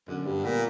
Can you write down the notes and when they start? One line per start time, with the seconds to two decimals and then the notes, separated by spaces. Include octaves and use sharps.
0.08 F#2 D3
0.26 G2 G3
0.44 A#2 B3